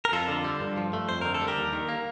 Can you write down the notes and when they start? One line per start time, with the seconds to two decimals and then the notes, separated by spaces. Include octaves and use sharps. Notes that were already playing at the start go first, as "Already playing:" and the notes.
0.05 A#4
0.12 F2 F4 A4
0.28 D3
0.44 G3
0.60 G2
0.77 F3
0.93 A3
1.09 F2 C5
1.21 D3 A#4
1.34 A4
1.41 G3
1.48 G4 A#4
1.57 D#2
1.73 D#3
1.89 A#3